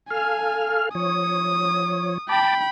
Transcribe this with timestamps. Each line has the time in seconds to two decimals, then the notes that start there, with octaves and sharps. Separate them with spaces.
0.10 A4 F5 G#5 F6
0.95 F3 C#5 D#6
2.29 G5 A5 B5 D6